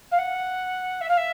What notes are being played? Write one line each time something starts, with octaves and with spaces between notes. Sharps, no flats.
F5
F#5
E5
F5
E5